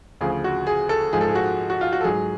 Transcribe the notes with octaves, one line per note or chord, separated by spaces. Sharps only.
D2 C#3 F3 G#4
F#4
G#4
A4
G#2 F3 G#4
A4
G#4
F#4
F#4
F4
F#4
A4
G#2 F#3 G#4